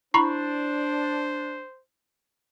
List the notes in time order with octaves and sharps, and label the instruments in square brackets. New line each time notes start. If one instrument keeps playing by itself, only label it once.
[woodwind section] D4 [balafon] E4 [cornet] C5 [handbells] A#5 B5 C#6